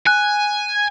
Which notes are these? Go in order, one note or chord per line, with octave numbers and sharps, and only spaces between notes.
G#5 F#6